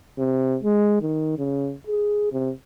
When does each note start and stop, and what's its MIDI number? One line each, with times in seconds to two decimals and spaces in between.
0.19 0.57 48
0.63 1.00 56
1.01 1.33 51
1.38 1.74 49
1.87 2.31 68
2.32 2.51 48